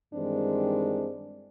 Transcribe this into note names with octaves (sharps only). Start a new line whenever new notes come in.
G2 D#3 E3 G#3 C4 D4